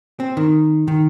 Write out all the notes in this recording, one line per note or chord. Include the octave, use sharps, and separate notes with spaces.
C4
D#3
D#3